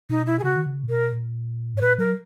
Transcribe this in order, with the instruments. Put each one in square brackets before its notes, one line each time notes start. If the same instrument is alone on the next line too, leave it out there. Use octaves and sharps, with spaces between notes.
[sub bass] B2 [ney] D#4
[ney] E4
G#4
[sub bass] C#3 [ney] F#4
[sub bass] D#3
C#3
A#2
[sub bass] B2 [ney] A#4
[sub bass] A#2
G#2
[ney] C#5
[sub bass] A#2 [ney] B4
[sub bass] F#3 [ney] A#4